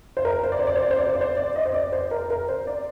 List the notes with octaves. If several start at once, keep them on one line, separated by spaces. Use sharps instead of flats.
C5
A#4
C5
D5
C5
D5
C5
D5
C5
D5
C5
D5
C5
D5
D#5
C5
D5
C5
A#4
A#4
C5
D5